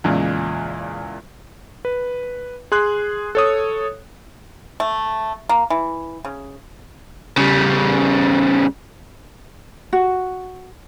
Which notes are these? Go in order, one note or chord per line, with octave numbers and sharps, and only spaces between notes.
E2 A#2 C#3 G#3
B4
G#4 C6 F#6
A4 C#5 D#6
A3
A#3
E3
C#3
C#3 G3
F#4